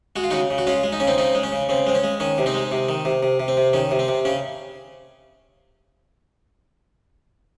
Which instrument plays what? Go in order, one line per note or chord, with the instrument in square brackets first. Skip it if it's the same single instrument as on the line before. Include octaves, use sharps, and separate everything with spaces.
[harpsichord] G#3 F#4
F4
C#3 D#4 F#4
C#3
F#4
G#3 C#4 F4
G#3
D#4
C#3 C#4
C4 D#4
C#3 C4 D#4
G#3
C#4
C#3
C#3 C4
G#3 C4
C#4
G#3
D#3 C#4
C3
C4 D#4
G#3
C3
D#3
C3
C3
C3
C4
C3
D#3 C#4
C3
C4
C3
C#3 C#4